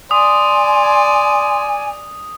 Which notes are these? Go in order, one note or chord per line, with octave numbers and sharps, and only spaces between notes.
D5 G#5 C6 D#6